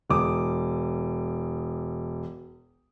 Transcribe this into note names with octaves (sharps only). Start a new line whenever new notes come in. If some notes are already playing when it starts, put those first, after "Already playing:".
E1 D6 D#6